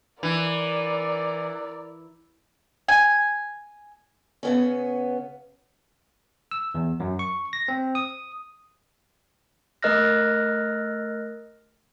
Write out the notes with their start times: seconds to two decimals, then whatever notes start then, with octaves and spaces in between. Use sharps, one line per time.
0.23 E3 A#4 D5
2.88 G#5
4.43 C#3 B3 C#4
6.51 E6
6.75 E2
7.00 F#2
7.19 C#6
7.53 A#6
7.68 C4
7.95 D#6
9.83 A3 A#4 D#5 F6 F#6 A#6